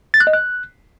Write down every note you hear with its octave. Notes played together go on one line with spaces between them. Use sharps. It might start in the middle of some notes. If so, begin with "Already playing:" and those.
A6
F#6
D#5
F#6